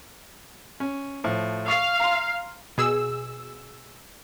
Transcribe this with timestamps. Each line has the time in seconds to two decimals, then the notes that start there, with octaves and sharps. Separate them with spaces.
0.80 C#4
1.24 A2 F3
1.68 F5 C#6
2.00 A#5 C6
2.78 B2 G#4 E6